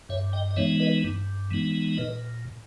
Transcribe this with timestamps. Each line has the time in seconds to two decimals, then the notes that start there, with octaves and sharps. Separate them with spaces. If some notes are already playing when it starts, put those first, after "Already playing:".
0.09 G2 C#5 E5
0.33 D#5 G5
0.51 D#5
0.56 E3 G#3 B3 D#4 C#5 E5
0.80 B4 D#5
1.04 G2
1.51 E3 G#3 B3 D#4
1.97 A#2 B4 D#5